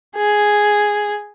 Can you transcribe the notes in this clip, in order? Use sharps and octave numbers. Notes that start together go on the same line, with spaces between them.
G#4